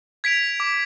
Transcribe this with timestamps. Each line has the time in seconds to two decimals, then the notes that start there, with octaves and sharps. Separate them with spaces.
0.24 G#6 B6 D7 F7
0.60 D6